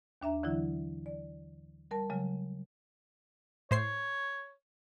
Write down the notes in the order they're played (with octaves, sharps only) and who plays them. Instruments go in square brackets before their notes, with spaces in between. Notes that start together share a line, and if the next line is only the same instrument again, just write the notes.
[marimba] D#2 D4 E5 A#5
D3 E3 F#3 E4
D5
G3 A#4 A5
C#3 F#3 G#3
[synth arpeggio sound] A2 C5 C7 [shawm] C#5